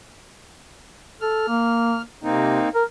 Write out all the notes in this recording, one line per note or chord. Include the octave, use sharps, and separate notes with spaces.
A4 F6
A#3
C3 A#3 C4 D#4
A#4